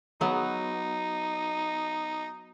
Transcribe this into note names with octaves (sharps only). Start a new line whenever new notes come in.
F#3 B3 D#4